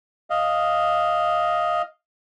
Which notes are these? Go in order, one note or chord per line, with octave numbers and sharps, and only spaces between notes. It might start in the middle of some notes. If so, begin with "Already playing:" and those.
D#5 F5